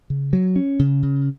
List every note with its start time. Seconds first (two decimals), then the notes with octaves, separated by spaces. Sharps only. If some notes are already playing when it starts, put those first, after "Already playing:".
0.10 C#3
0.33 F#3
0.56 C#4
0.79 C#3
1.03 C#3